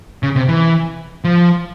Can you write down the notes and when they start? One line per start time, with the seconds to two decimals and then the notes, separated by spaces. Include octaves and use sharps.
0.23 C#3
0.36 C3
0.48 E3
1.24 F3